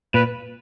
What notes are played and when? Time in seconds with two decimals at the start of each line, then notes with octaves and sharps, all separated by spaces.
0.14 A#2 B4